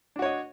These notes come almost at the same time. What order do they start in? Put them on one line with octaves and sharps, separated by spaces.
D4 F#4 C#5 D#5